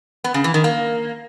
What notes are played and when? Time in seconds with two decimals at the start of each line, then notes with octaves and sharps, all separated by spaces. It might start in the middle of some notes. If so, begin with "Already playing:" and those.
0.24 B3
0.34 C#3
0.44 E3
0.54 D#3
0.64 A#3